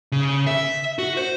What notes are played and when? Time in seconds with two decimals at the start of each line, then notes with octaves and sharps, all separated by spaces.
0.12 C#3
0.47 E5
0.98 F#4
1.17 C5